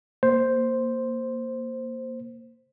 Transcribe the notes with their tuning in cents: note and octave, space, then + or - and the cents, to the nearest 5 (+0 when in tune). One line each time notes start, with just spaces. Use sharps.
A#3 +0 C5 +0